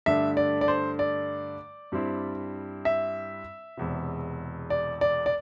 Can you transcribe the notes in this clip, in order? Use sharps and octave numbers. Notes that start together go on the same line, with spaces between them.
G2 D3 A3 D4 E5
D5
D5
C5
D5
G2 G3 C4 E4
E5
E1 E2 C3
D5
D5
D5